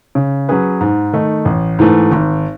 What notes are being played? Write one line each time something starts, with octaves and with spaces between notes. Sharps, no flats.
C#3
F#3 C#4 G#4 B4
G#2
D#3 A3 D#4
A1
G#2 E3 A3
G#1